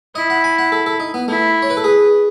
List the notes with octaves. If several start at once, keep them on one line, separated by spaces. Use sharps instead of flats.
E4 D#5
F#5
G#5
F#5
A4
A4
D#4
B3
A3 E4
C#5
B4
A4
G#4 B4